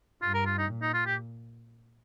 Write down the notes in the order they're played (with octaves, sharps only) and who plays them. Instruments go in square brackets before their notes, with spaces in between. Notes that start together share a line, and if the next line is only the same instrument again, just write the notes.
[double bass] G2 [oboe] F4
[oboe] A#4
F4
D#4
[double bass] A#2
[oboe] D#4
F4
G4